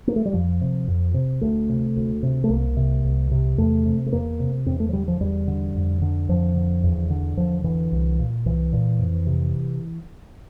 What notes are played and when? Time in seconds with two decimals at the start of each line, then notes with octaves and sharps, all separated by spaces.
0.07 A#3
0.16 A3
0.25 G3
0.33 F2 F3
0.61 C3
0.88 F2
1.14 C3
1.41 D2 A3
1.69 C3
1.96 D2
2.23 C3
2.44 A3
2.50 C2 A#3
2.77 C3
3.05 C2
3.31 C3
3.58 E2 A3
3.86 C3
4.06 A3
4.12 E2 A#3
4.40 C3
4.66 E2 C4
4.80 A3
4.89 F3
4.93 D3 G3
5.08 F3
5.21 E2 G3
5.48 D3
5.75 F2
6.02 D3
6.29 F2 F3
6.56 D3
6.83 E2
7.10 D3
7.37 E2 F3
7.64 D3 E3
7.92 C2
8.19 A#2
8.45 C2 E3
8.73 A#2
8.99 F2
9.27 C3